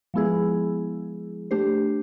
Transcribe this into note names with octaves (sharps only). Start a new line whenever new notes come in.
F3 G#3 B3 E4 G#4
A3 D4 G4 C5